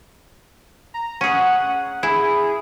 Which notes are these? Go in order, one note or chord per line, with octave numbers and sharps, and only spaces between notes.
A#5
C#4 G#4 F#5
E4 G#4